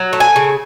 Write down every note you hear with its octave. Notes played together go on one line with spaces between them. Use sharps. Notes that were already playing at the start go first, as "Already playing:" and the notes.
Already playing: F#3
A3
G#5
C#3